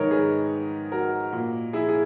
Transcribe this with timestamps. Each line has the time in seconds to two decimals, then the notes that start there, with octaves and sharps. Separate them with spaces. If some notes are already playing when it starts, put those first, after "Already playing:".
Already playing: G#2 D#3 A#4 B4 C#5 D#5
0.11 G#4 B4
0.92 F#4 A#4
1.33 A#2
1.73 E4 G#4
1.89 G#4